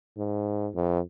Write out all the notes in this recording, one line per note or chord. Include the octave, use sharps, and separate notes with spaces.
G#2
F2